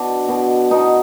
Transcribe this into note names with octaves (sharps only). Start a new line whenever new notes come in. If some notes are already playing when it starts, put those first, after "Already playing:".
Already playing: B2 D4
B2
B2 D#4